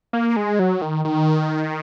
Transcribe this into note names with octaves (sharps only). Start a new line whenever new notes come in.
A#3
G#3
F#3
D#3
D#3